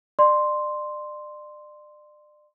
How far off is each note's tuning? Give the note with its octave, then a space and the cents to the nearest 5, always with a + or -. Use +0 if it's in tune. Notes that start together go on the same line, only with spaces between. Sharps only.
D5 +35 C6 +0